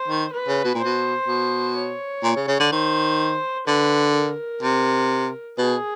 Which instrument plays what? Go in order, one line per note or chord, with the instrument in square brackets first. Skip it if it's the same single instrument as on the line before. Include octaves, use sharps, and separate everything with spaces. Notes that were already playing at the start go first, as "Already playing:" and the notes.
Already playing: [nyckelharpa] C5
[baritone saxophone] D#3
[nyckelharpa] B4
[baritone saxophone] C#3
B2
A#2
[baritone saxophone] B2 [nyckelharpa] C5
[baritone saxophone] B2
[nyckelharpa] C#5
[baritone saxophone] A#2
C#3
C#3
D3
[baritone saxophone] D#3 [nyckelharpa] C5
[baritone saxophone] D3 [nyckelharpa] B4
[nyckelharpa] A#4
[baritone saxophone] C3
[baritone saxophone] B2 [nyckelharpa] G#4